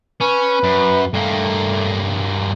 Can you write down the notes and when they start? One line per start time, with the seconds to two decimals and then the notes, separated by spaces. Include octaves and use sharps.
0.21 C#4 B4
0.64 F#2
1.14 G2 A3 A#3